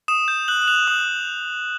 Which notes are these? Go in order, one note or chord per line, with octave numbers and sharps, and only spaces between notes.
D#6 E7
G6
F#6 F#7
F#7
F#6 F7
D#6 F#7